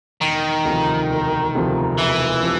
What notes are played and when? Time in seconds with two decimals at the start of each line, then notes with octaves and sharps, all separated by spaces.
0.22 E1 D#3
0.65 D2 C3 F3
1.10 E1
1.55 D2 C3 F3
1.98 E1 E3
2.43 C3 F3